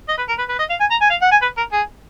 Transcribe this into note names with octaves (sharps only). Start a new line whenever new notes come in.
D#5
B4
A#4
B4
B4
D#5
F5
G#5
A#5
G#5
F5
F#5
G#5
B4
A#4
G#4